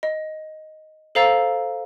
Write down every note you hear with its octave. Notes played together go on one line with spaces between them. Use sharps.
D#5
A4 C5 F5 A#5 E6 A6